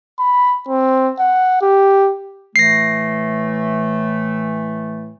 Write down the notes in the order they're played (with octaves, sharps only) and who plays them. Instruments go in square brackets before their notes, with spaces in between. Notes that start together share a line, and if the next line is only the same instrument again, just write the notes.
[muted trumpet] B5
C4
F#5
G4
[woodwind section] A2 E3 A3 [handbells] A#6 C7